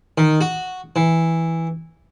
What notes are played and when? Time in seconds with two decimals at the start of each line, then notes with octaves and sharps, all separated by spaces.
0.18 D#3
0.41 F#4
0.96 E3